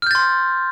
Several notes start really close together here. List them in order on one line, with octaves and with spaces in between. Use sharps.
F6 G6 A6 C6